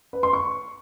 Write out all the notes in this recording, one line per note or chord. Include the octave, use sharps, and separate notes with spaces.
B4
C6
C#6